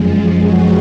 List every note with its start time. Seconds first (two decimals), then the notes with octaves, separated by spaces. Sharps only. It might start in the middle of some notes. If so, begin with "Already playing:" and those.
Already playing: F#2 F3 G#3
0.45 F#4